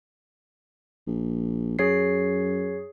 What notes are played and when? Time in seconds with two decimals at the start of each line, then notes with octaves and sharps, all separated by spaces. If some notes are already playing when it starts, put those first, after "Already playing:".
1.07 A#1
1.79 F#2 G#4 C#5 C7